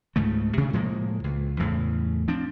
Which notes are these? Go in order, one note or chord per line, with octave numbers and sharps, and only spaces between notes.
C#2 G#2 C#3 A3
D2 C3
A2 F3 G#3 A#3
C#2
E2 A2 C#3
F3 C4 D4